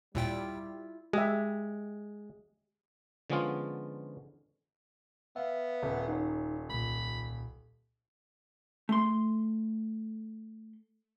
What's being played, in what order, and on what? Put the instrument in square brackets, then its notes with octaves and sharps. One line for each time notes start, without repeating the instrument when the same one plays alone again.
[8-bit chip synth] D#2 A#2 G5 [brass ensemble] G3 [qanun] E4 F4
[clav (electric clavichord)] G#3 [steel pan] G4 E5
[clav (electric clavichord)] D3 F3 G#3 B3 C#4 F4
[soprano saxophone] B3 [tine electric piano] E5 F5
[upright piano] D#1
[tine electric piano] D#4 C#5
[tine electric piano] C2 A#2 [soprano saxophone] B5
[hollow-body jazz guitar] A3 C6